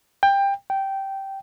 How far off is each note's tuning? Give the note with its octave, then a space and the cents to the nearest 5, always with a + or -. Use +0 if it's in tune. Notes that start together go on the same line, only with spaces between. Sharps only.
G5 +20
G5 -10